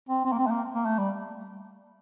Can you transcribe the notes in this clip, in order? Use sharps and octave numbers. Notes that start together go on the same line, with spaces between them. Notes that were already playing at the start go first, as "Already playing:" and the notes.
C4
C4
A#3
C4
A3
A#3
A#3
A3
G3